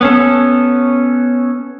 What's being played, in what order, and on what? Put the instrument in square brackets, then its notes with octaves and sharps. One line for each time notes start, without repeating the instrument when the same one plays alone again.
[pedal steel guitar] B3 C#4 A4